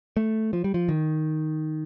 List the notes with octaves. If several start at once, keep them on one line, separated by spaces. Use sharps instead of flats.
A3
F3
G3
F3
D#3